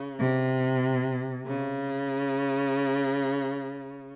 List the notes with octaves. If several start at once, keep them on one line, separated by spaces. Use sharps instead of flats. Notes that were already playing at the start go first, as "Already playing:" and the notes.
Already playing: C#3
C3
C#3